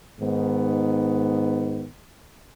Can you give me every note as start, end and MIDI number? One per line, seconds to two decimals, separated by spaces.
0.20 1.86 44
0.20 1.86 51
0.20 1.86 59